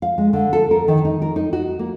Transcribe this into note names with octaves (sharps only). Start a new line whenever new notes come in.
F5
G#3
D3
A4
A#4
D#3
D#4
A#4
D#4
F#4
A#3